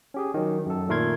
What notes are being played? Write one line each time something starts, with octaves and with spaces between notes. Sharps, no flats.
C#4 G4 G#4
D#3 F#3
F#2 A4
A#2 D#3 A3 A#4 C6 G#6